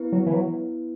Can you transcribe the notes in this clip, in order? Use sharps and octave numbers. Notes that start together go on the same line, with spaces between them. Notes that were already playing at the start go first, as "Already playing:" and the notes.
Already playing: B3 E4 B4
F#3
E3
F#3